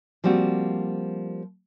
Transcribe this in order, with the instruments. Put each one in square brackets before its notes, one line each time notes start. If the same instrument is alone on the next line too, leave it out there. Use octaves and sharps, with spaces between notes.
[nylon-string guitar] F3 G3 A#3 C4 F#4